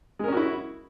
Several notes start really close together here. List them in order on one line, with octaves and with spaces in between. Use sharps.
G#3 A#4 C#4 F#4 E4